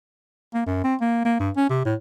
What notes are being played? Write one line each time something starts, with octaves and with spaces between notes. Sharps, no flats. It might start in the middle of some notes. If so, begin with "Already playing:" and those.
A#3
F#2
C4
A#3
A#3
G2
C#4
C3
A2